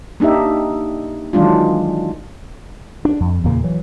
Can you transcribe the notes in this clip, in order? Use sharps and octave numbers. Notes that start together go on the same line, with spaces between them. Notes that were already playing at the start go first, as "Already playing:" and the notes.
A#3 D4 D#4 G4 E5
D#3 E3 F#3 G#3 D4 F4
D4
F2
E2 A#2 C#3 A#3
E3 F#3